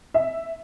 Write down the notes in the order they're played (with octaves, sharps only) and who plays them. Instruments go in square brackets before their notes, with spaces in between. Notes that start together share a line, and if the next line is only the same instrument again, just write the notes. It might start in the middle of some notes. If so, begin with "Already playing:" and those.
[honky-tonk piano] E5